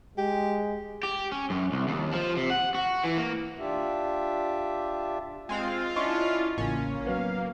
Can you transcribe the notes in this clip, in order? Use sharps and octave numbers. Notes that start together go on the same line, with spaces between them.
G#3 G4
G4
C#4
F#2
C2
D#2
F3
C3
F#5
F#4
E3
A#3
D4 F4 G4 E5
G#3 C4 F4 F5
C#4 D4 E4 D#5 C6 C#6
A1 C#3 A#3 C#4
F#3 B3 F5